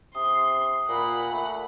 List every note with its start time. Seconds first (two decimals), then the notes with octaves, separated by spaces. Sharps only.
0.15 C3 C6 D#6
0.88 A#2 F#5 B5
1.32 A3